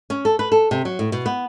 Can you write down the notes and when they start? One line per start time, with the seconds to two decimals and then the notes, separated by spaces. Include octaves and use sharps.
0.10 C#4
0.25 A4
0.39 B4
0.52 A4
0.71 C3
0.85 F#3
0.99 A2
1.12 B2
1.26 B3